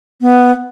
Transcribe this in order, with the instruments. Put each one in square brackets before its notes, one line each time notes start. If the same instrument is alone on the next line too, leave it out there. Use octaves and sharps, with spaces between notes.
[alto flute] B3